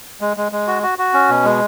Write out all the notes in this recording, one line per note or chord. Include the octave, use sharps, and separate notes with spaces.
G#3
G#3
G#3
F#4
F#4
F#4
C#4
B2
G#3